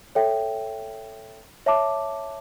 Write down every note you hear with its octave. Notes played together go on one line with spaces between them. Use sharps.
A4 C#5 E5 G5
C#5 E5 A5 D6